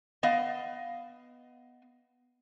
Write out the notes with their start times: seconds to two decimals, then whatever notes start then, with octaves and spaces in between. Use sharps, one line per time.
0.23 B3 D#5 F5